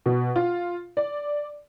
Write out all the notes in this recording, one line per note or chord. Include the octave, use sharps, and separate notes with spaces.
B2
F4
D5